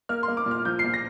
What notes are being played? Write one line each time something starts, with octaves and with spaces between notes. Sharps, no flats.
A#3 F6
C6
A#3
D6
A#2
F6
F3 G6
C7
A#2
A#6